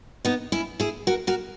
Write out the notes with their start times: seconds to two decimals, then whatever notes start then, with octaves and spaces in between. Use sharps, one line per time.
0.25 B3 D#4
0.52 C#4 E4
0.80 E4 G#4
1.07 F#4 A#4
1.27 F#4 A#4